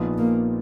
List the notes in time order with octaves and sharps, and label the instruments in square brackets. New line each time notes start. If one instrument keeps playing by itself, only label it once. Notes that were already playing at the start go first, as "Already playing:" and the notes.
Already playing: [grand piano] A#1 A#2 F3 B3 D#4
[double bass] A#3